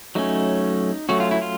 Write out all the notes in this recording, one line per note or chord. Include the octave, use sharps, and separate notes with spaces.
F#3 A3 C#4 D#4
F#3 A3 C#4 F#4
F4
E4
F4